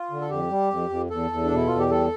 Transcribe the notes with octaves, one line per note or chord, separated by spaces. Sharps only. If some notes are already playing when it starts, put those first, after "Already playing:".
Already playing: F4
D3
A4
F2 G4
G3
F2
F2
E2 A4
E2
D4
B2
E4
E2 F4
G4
G3 A4